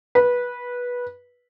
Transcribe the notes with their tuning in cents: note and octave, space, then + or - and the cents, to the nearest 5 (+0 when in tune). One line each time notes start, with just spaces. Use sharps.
B4 -15